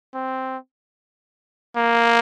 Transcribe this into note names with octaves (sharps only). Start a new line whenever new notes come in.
C4
A#3